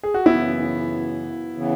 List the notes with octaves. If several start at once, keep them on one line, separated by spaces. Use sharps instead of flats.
G#4
F#4
F#2 C#3 E3 B3 E4
C#3 E3 B3